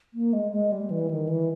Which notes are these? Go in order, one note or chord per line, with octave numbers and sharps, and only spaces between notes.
A#3
G#3
G#3
G3
E3
D#3
E3